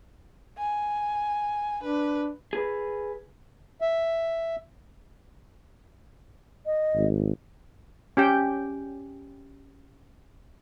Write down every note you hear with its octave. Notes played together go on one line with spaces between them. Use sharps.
G#5
D4 B4
G#4 B4
E5
D#5
G#1
C#4 G4 G5